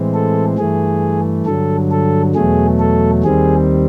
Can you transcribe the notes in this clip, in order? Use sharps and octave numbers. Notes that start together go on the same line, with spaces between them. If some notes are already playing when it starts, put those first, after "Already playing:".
Already playing: A2 E3 G#3 C4
A4
G2 E3 A3 G#4
G2 D3 F#3 A4
A4
E2 B2 F#3 A3 G#4
A4
D#2 D#3 G3 C4 G#4